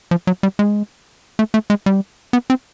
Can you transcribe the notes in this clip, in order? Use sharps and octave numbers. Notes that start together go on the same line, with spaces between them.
F3
F#3
G3
G#3
A3
A3
G#3
G3
B3
C4